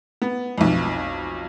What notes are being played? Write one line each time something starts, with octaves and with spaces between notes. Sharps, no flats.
B3
B1 F2